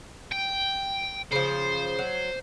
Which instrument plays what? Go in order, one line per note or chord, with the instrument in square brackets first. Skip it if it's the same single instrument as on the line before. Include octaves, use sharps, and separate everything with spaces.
[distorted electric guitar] G5
[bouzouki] C#3 F3 [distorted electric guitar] C5
[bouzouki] F#3